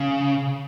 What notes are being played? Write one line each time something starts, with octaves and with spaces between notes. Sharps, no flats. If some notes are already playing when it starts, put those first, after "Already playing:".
Already playing: C#3